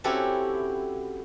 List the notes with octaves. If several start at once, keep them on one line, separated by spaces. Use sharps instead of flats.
C4 C#4 E4 F#4 G4 A4